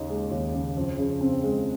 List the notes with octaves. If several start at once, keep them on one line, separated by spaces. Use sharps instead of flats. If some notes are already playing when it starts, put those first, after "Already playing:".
Already playing: D#2 C#3 D#4
G#3
D#2
C#3
F2
C#3
C4
G#3